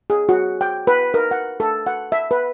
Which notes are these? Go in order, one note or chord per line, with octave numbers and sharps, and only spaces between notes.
G#4
F#4
G5
B4
A#4
F#5
A4
F#5
E5
B4